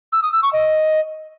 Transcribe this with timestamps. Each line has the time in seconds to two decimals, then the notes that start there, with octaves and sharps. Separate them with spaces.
0.12 E6
0.22 D#6
0.32 E6
0.43 C#6
0.53 D#5